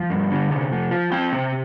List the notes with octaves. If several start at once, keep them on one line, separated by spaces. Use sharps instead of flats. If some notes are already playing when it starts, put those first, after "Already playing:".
Already playing: F3
G2
D3
C3
F3
F4
C4 G5
C3